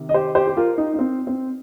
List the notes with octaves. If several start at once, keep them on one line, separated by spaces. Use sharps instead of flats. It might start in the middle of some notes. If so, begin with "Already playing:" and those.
Already playing: C3 D#3
D#5
G4 C5
G4 C5
G4
F4 A#4
D#4
D#4
C4
C4